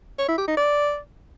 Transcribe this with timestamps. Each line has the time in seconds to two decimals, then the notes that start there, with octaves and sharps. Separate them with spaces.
0.19 C#5
0.28 E4
0.38 G4
0.48 D#4
0.57 D5